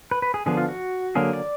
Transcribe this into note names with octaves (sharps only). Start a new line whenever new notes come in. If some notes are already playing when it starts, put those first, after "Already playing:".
B4
B4
G#4
D3 F3 B3 G#4
F4
F#4
D3 F#3 A#3 G#4
D5